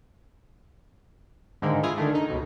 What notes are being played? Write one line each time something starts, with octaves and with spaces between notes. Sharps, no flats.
G#2 D3 D#3 G#3 A#3
E4 F4 G#4
D3 D#3 A3
D#4
C#2 B2